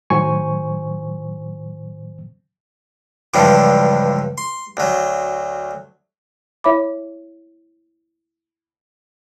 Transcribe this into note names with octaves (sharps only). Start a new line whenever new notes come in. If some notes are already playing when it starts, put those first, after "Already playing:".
A2 D#3 F#3 C5 G#5 C#6
C#2 G2 D3 E3 F3 G3
C6
D2 F#3
E4 C#5 E5 B5 D6